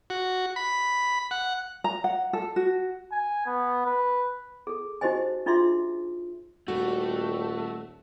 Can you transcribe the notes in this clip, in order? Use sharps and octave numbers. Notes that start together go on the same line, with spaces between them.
F#4
B5
F#5
A#5
F#5
A4
F#4
G#5
B3
B4
G#4 A4
D#4 F#4 G4 C5 D#5 G#5
D4 D#4 F4 G#4 E5 C6
D#1 G3 A3 F#4